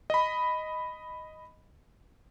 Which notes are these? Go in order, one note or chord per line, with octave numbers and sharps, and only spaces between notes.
D#5 B5